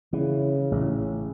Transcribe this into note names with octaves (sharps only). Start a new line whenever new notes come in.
C#3 E3
A1